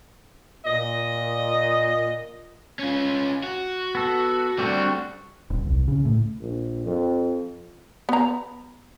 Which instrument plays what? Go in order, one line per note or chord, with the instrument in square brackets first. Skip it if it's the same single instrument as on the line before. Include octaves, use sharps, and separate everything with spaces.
[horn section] A#2 D#5
[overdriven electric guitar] C#4 F4
F#4
[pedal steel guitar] B3 A4
[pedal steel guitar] G3 C4 F#4 [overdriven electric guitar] A3 D4
[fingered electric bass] D#1
C2
C#3
A2
[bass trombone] A#1
F2
[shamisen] B3 A#5